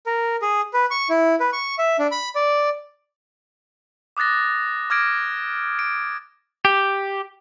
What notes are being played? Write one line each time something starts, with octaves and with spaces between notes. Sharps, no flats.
A#4
G#4
B4
C#6
E4
B4
C#6
E5
D4
B5
D5
D6 D#6 F#6 A6 A#6
D6 F6 G#6 A#6 D7
D7
G4